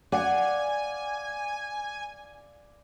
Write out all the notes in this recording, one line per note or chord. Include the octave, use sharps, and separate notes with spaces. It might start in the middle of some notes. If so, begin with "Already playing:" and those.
D5 F5 F#5 G#5